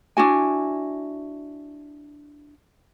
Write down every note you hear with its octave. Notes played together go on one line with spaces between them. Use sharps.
D4 E4 F#4 G#5